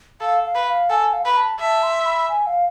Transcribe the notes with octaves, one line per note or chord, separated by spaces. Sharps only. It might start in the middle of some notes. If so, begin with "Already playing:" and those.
A4 F5
F5
B4
F5
A4 G#5
F5
B4 B5
A5
E5 A5
C6
B5
G#5
F5